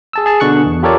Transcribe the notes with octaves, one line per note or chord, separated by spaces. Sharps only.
G#4 A5 E6
G#4 A5
B2 D3 C#6 F#6 C#7
E2
F4 G4 A4 A#4 C#5 D5